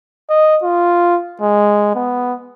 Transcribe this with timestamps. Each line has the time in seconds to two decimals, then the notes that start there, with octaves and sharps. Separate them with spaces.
0.30 D#5
0.63 F4
1.41 G#3
1.95 B3